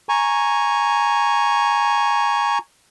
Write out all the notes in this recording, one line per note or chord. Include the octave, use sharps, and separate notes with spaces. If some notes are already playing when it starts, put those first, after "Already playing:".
G#5 A#5 C#6